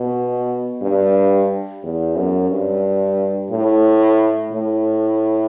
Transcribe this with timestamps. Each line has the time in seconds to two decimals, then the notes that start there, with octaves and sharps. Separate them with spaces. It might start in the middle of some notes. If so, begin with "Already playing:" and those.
Already playing: B2
0.82 G2
1.83 E2
2.16 F#2
2.50 G2
3.50 A2
4.52 A2